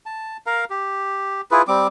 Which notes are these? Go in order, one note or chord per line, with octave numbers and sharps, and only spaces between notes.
A5
A#4 F5 A#5
G4
E4 F4 G#4 B4
G3 C4 D6